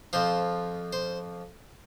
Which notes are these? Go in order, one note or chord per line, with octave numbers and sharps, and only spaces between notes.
F2 F3 C5
C5